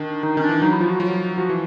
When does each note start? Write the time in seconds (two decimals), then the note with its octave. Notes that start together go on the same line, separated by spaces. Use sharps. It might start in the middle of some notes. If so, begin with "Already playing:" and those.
Already playing: D#3 D4
0.23 D#3 D#4
0.37 D#3 C#4
0.43 D4
0.49 E3
0.62 F#3 D#4
0.71 E4
0.80 F3 F4
0.90 F#4
1.00 F#3 F4
1.38 F3 F#4
1.49 E3